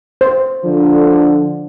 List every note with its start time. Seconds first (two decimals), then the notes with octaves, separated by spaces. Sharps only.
0.21 C5
0.65 D3 F3